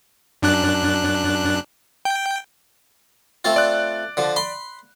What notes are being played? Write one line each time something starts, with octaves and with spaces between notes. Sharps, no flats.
F#2 D4 F#6
G5
A3 C4 F4
D5 F#6
D3 F3
B5 C6